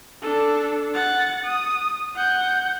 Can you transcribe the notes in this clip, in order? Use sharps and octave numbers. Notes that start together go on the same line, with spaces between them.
D4 A4
F#5 A6
D#6
F#5 G6